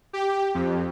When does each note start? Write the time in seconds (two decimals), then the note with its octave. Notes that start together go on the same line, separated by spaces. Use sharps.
0.13 G4
0.54 F2